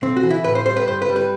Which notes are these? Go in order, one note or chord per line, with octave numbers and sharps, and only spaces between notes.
B1 C4
F#4
E3
E4
A2 B4
C5
G3 C5
B4
G2 C5
B4
G3
B4